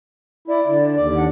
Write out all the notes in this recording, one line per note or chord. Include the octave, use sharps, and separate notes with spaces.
E4 D5
D3
D#2 D5
D4 F#5